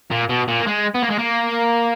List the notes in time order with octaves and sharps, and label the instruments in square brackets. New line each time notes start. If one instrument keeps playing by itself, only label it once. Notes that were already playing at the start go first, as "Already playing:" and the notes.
[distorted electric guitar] A#2
B2
A#2
A#3
G#3
B3
A#3
G#3
A#3